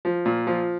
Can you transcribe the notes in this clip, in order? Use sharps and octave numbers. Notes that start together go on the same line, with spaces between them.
F3
A#2
F3